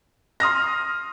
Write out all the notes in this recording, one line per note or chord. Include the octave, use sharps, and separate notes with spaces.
C6 D#6 F6 A#6